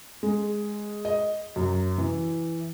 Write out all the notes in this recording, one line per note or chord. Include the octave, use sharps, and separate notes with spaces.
G#3
D#5
F#2
E3